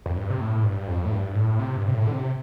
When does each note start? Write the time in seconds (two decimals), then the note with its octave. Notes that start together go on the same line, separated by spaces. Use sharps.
0.06 F2
0.17 G2
0.30 C3
0.41 A2
0.64 G2
0.88 F2
1.05 A2
1.12 G2
1.35 A2
1.59 C3
1.77 G2
1.88 C3
1.94 A2
2.07 D3
2.13 C3